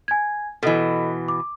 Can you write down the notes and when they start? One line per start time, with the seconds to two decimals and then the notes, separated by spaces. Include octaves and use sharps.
0.08 G#5 G#6
0.63 B2 E3 A4 D#5
1.28 D6